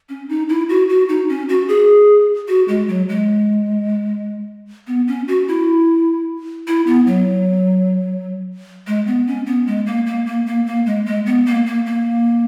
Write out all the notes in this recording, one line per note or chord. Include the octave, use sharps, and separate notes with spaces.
C#4
D#4
E4
F#4
F#4
D#4
C#4
F#4
G#4
F#4
G#3
F#3
G#3
B3
C#4
F#4
E4
E4
B3
F#3
G#3
B3
C#4
B3
G#3
A#3
A#3
A#3
A#3
A#3
G#3
G#3
B3
A#3
A#3
A#3